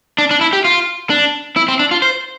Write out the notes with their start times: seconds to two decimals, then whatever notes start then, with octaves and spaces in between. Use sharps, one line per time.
0.18 D4
0.31 D4
0.41 E4
0.53 G4
0.65 F4
1.10 D4
1.56 E4
1.68 C4
1.79 D4
1.91 F4
2.02 C5